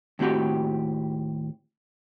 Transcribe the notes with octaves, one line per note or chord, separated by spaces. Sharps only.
D#2 A2 C4 F#4 G4